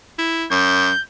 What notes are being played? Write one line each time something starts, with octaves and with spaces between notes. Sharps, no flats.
E4
F#2 G6